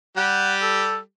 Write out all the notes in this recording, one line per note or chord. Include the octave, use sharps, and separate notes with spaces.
G3 G4 F#5
A4